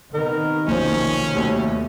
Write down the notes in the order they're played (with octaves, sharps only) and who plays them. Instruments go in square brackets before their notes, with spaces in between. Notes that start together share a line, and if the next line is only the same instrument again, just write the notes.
[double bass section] C3 D#3 [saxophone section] B3 D#4 A#4
[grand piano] F#1 B1 [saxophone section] F3 C5 [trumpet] C#4
[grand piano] D#2 [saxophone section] B2 G3 A3